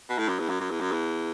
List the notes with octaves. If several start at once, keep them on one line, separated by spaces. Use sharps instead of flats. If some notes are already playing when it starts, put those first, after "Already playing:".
B2
A2
F#2
E2
F#2
F#2
E2
F#2
E2